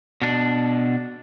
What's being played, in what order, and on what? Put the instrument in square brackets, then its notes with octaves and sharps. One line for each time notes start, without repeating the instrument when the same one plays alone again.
[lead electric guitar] B2 D4